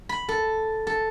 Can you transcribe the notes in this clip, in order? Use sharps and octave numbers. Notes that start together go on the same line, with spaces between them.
B5
A4
A4